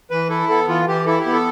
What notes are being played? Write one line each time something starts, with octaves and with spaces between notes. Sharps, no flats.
E3 B4
E4 A4
B3 A4
E3 F4
E3 G4
E4 A4
G4
B3
A4